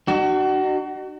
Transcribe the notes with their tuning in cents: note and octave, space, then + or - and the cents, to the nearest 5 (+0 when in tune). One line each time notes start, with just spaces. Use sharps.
D#4 -45 F#4 +30